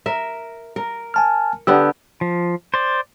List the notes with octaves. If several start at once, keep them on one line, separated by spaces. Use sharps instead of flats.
A#4 E5
A#4
G#5 A5 F6
D3 B3 G4 E6
F3
C5 D5